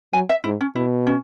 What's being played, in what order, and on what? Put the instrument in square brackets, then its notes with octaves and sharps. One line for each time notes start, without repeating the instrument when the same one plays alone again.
[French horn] F#3 [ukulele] G#5
[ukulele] E5
[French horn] G#2 [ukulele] E4
[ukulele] C#4
[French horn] B2 [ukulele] E4
[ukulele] C#4